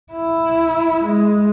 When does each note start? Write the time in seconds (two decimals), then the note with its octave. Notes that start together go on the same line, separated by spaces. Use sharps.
0.12 E4
1.04 G#3